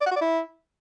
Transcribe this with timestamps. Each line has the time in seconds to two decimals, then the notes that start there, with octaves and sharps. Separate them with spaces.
0.01 D5
0.06 F#5
0.11 F#4
0.16 D5
0.21 E4